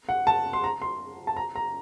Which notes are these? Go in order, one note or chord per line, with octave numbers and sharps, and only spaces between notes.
F#5
A5
C6
A#5
C6
A5
A#5
A#5